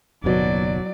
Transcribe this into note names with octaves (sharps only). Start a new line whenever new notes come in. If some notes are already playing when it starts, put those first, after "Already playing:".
F#1 D#2 B2 F#3 D5